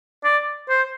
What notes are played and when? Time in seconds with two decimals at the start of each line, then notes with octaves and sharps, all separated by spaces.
0.24 D5
0.69 C5